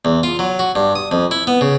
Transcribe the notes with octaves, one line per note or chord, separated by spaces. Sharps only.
E2
F4
F#3
F#4
G2
D#6
F2
E4
B3
C#3